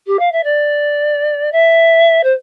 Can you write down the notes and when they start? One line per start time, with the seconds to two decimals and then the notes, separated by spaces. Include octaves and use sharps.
0.06 G4
0.19 F5
0.32 E5
0.43 D5
1.52 E5
2.23 C5